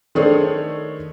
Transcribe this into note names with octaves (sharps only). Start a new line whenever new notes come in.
D#3 A3 D4 G#4 C5 C#5